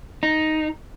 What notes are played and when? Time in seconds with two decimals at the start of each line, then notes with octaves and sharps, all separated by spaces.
0.23 D#4